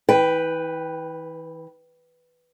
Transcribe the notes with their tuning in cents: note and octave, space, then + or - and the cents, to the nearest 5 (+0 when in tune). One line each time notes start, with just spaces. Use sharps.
E3 -35 B4 +0 G5 +0